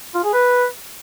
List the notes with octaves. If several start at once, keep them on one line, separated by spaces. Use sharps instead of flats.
F4
G#4
B4